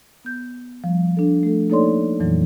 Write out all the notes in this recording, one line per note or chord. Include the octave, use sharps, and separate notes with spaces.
B3 G6
F3 G3
D4 A4
A3 A4
A#3 D#4 A4 C#5 D5 C6
F2 A#2 E3 F#3